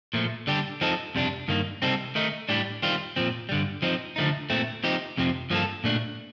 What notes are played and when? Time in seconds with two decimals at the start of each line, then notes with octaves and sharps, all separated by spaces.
0.13 A#2 F3 A3
0.47 D3 G3 D4 G4
0.81 F3 C4 D#4 A4
1.15 F2 C3 G3 D4
1.48 G2 D#3 A#3
1.82 C3 G3 C4 D#4 A4
2.15 D#3 A3 D#4
2.49 A2 G3 D4 G4
2.83 D#3 G3 C4 F4
3.16 A#2 F3 C4
3.49 G2 D3 G3
3.82 F3 C4 D#4
4.16 D3 F3 A3 D#4
4.50 A#2 A3 C4
4.84 F3 C4 D#4 G4
5.18 F2 C3 F3 C4
5.50 G2 F3 A#3 F4 A4
5.84 A#2 A3 D4